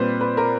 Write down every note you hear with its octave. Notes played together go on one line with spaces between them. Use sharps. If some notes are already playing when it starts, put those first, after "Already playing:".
Already playing: A#2 G3 C4 B4 C5
B4
A#4